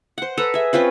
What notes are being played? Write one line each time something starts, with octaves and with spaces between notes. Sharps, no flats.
C5 F#5
A4 B4 A#5
G#4 E5
C4 C#4 F4 B4